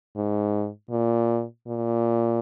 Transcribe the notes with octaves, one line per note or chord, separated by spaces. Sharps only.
G#2
A#2
A#2